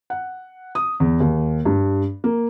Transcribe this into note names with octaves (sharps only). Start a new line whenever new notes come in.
F#5
D#6
E2
D#2
G2
A#3